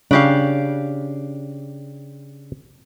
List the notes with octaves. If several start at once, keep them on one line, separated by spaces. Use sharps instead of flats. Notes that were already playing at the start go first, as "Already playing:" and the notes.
C#3 D4 G4 F5